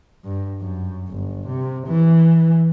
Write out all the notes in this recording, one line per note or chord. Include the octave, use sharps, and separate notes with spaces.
G2
F#2
G1
C3
E3